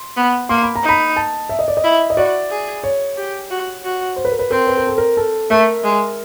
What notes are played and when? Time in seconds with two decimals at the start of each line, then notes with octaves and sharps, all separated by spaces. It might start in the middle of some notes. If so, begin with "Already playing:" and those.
Already playing: C6
0.17 B3
0.49 A#3 C6
0.63 B5
0.75 A#5
0.83 D#4
0.89 B5
1.16 A5
1.49 E5
1.59 D#5
1.68 D5
1.77 D#5
1.84 E4
2.10 D#5
2.17 F#4 D5
2.50 G#4
2.84 C#5
3.17 G4
3.51 F#4
3.84 F#4
4.16 C5
4.25 B4
4.32 A#4
4.39 B4
4.50 C4 A#4
4.67 B4
4.77 A#4
4.87 A4
4.98 A#4
5.17 A4
5.50 A3 A#4
5.84 G#3